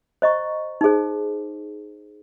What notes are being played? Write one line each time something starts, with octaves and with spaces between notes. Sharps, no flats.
C5 D#5 A#5 C#6
D#4 G#4 C5